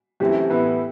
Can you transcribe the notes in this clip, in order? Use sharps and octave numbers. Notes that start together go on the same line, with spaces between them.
F#2 E3 A3 C4 E4 G4
A2 E3 B3 E4 B4